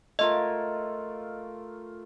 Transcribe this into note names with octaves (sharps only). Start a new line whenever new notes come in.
A3 F4 A#4 D#5